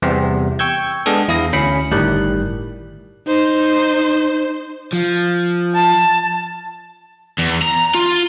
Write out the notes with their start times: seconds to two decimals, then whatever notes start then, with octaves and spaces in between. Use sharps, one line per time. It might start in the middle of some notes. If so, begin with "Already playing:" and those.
0.02 E2 C3 G3 B3 C4
0.59 G5 C#6 E6 G6 G#6
1.06 G#3 B3 D4 G#4 A4
1.28 E2 E4 F5 D#6 A#6
1.53 D2 C#4 B5 C#7
1.92 G1 A2 D#3 G3 F#6
3.27 D#4 C5
4.93 F3
5.74 A5
7.38 E2
7.62 A#5
7.95 F4